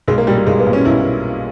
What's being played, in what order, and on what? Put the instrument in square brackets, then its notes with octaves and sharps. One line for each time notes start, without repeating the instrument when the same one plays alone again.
[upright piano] B1 G#3
A#3
A#2 G3
G3
B1 G#3
B3
A#2
C#4
B1 E4